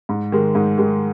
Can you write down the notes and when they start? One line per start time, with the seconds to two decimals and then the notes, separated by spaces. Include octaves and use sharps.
0.09 G#2
0.32 D#3 G#3
0.55 G#2
0.78 D#3 G#3